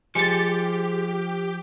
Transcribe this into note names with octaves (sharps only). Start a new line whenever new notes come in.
F3 G#3 G4 A6 C#7